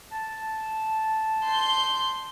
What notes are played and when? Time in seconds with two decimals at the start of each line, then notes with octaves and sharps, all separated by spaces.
0.12 A5
1.45 C6 G6